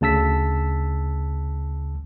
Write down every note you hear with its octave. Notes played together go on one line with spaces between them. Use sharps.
D2 C#3 A5 E6 B6